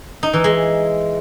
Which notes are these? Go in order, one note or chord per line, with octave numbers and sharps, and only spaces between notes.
D#4
E3
G#3